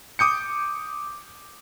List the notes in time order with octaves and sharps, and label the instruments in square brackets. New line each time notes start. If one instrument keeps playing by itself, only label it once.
[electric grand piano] D6 D#6 G6 C#7